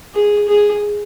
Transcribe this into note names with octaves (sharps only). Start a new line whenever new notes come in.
G#4
G#4